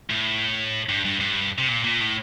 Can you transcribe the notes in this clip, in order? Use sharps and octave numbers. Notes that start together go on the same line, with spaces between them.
A2
G2
G2
G2
C3
A#2
A#2
A2